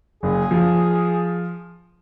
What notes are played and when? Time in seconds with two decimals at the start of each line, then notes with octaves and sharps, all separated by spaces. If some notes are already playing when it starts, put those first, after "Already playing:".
0.23 F#1 G#4
0.51 F3